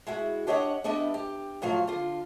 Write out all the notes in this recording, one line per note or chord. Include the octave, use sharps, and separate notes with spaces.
G#3 E4 F#4
D4 G4 C#5 D#5 E5 F#5
G3 B3 D4 E4 D#5
G4
A2 F3 F#3 F5
D3 F4